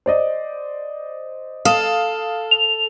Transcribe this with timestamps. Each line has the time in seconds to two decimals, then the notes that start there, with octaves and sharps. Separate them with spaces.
0.06 C5 D5 D#5
1.65 A4 F5 D#6
2.51 F7